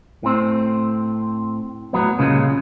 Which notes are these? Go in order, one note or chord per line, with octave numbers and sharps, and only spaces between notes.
A2 C4
A2 F3 F#3 B3
C2 A#2 C#3 G#3